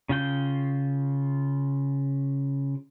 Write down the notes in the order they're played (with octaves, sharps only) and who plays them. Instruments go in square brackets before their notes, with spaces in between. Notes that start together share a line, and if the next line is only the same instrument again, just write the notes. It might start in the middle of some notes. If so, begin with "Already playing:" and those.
[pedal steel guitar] C#3 F4 G5